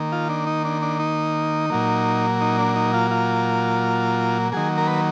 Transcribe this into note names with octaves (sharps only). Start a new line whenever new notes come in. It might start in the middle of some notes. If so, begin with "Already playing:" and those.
Already playing: D#3 A#3
F4
D4
D#4
D4
D4
D#4
A#2 F#3 A#3
D#4
D4
D#4
F4
F4
D#3 F#3 A#3 G#4
A#4
B4